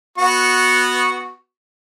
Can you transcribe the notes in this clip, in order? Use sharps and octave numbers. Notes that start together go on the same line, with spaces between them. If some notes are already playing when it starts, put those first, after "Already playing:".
B3 F#4 C#6